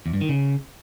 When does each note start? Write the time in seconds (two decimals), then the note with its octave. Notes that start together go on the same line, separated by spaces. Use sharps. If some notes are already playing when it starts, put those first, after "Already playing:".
0.06 E2
0.13 G2
0.21 D#3
0.29 C#3